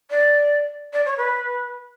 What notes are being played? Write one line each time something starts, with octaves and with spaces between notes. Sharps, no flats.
D5
D5
C#5
B4